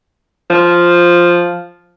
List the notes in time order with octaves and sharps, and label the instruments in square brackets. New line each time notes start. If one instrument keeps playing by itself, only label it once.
[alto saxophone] F3